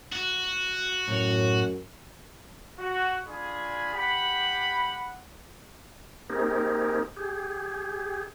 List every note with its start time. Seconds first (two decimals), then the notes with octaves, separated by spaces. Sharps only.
0.12 F#4
1.08 F#2 A2 C#5
2.78 F#4
3.26 D4 F4 G#4 G#5 B5
3.94 G4 F#5 B5
6.30 A#3 C4 D#4 G4 G#4 A#4
7.17 G4 G#4